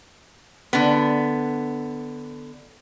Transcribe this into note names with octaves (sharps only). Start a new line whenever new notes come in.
D3 B3